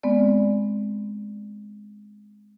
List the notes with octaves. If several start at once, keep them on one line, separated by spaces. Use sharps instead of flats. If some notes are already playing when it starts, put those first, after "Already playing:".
G#3 B3 C4 D5